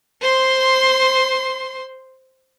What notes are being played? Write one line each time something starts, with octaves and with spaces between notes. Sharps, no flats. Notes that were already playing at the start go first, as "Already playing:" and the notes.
C5 C6